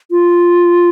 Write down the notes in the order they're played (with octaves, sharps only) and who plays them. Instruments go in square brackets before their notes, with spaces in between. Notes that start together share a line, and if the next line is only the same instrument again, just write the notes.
[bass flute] F4